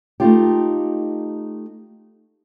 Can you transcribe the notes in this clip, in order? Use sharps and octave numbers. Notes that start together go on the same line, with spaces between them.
A3 D#4 F4 G4